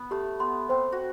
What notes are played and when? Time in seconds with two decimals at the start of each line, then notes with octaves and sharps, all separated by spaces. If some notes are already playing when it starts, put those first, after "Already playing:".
Already playing: B3
0.11 A3 G4
0.40 B3 C6
0.69 C4 C5
0.92 F#4